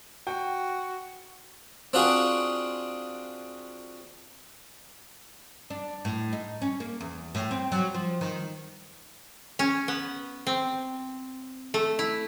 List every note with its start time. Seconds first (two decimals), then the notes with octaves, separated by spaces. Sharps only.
0.27 F#4 G5
1.93 C4 D4 F4 F#4 G#4
5.70 D4
6.05 A2
6.33 D#4
6.62 C#4
6.80 A#3
7.01 E2
7.35 A2
7.51 C4
7.72 F#3
7.94 F3
8.21 D#3
9.59 C#4
9.88 B3
10.47 C4
11.74 A3
11.99 E4